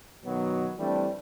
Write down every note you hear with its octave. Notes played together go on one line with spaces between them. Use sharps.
B2 D#3 F#3 B3
E3 G3 A3 C4 D4